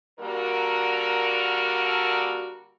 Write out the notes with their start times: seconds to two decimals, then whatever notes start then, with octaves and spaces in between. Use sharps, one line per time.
0.19 D3 G3 A#3 F#4 A#4